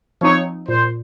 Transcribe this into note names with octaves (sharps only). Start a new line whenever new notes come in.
F3 C4 D#4 C#5
A#2 C5